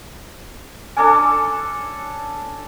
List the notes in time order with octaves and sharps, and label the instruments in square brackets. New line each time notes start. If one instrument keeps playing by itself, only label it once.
[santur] C#4 D4 A4 [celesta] G#5 D6